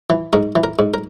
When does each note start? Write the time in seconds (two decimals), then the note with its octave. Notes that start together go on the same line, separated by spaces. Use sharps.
0.10 E3
0.33 G#2 A#4
0.56 E3
0.64 A#4
0.79 G#2
0.94 A#4